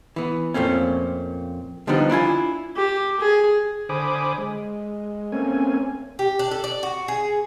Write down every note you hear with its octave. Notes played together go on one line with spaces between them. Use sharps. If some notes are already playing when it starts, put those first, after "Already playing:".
E3 B3
F2 A#2 A3 C4 C#4
D3 F3 G3 B3 D4 D#4
D4 E4 F4 G#5
G4
G#4
D3 C5 G#5 B5 D6 D#6
G#3
A3 A#3 C4 C#4 G#5
G4
D4
A4
D5
F#4
G#4